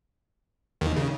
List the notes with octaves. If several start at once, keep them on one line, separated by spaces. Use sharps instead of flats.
D#2 D#3
C#3